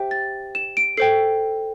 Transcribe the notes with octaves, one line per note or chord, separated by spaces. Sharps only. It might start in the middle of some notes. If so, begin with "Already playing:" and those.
Already playing: G4 C5 E5 G5
A6
E7
D7
A4 C5 G5 C7